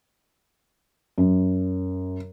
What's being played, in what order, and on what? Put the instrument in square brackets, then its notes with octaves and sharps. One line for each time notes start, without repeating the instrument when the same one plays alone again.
[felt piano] F#2